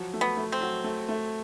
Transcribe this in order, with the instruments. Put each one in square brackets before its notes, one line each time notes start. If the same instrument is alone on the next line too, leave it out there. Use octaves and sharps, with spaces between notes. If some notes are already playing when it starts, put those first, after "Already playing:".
Already playing: [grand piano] F3 F#3
A3
[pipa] B3
[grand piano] A3
[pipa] C4
[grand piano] F#3
A3
A3